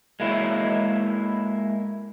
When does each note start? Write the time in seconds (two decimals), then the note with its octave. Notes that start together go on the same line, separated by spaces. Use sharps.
0.20 G#3 A#3 E4